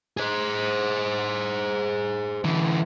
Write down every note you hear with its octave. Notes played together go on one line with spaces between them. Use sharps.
G#4 C5
D3 E3